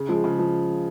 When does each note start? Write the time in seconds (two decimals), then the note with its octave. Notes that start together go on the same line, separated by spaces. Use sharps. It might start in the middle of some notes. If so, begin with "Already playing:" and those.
Already playing: C#3
0.09 F3 G#3
0.24 C#3
0.39 F3